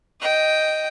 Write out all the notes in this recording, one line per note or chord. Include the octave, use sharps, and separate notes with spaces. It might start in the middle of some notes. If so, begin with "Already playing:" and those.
D#5 G5